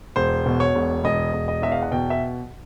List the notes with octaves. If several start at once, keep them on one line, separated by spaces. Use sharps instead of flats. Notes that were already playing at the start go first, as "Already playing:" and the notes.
E1 C5
B2
C#5
E1
E1 D#5
E1
D#5
E2 E5
F5
F#5
B2 G5
E5